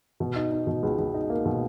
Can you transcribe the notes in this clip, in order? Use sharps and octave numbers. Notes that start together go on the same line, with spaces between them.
B2
D#4
D#4
B2
C#2
C#2
D#4
A#3
B2